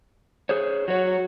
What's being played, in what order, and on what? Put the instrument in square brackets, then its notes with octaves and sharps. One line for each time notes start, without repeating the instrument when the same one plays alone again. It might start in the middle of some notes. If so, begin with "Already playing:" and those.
[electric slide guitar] G#4 C5 C#5
[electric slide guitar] F#3 C#5 [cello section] F#4